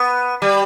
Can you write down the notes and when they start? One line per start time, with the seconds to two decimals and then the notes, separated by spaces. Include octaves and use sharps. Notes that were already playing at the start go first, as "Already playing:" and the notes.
Already playing: B3
0.42 G3